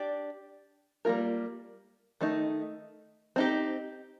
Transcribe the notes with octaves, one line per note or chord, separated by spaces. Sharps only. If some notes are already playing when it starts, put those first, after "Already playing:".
Already playing: D4 G4 D5
G3 A#3 F4 A#4
D#3 A3 D#4
C4 D#4 G4